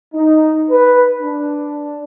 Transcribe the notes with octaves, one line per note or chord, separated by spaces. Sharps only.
D#4
B4
D4